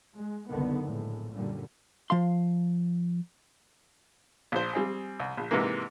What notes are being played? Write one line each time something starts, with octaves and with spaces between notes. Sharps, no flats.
G#3
F#1 C2 D3 D#3 B3
A#1 A2 G#3
F#2 A#2 D3 G3
F3 F5 C6
A#1 C5
G3 C4 G#4
C2
A#1
G#2 C3 E3 A#3